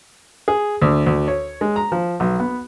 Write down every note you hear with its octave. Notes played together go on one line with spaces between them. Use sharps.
G#4
D2
D2
C#5
G#3
A#5
F3
B1
B3